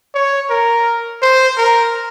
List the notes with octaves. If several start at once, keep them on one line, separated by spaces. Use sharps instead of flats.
C#5
A#4
C5
A#4